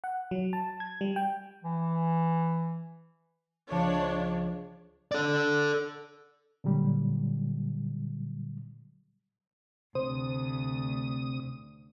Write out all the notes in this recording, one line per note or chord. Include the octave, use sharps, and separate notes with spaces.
F#5
F#3
A5
G#6
G3
G5
E3
C#2 F3 D4 C#5 A5
A4 D5
A#2 D3 F#3 G3
D2 C3 C5 D#6